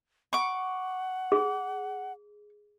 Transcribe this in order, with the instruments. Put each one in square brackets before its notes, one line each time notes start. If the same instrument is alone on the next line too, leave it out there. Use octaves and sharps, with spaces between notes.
[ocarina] F#5 [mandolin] C#6 D6
[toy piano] G#4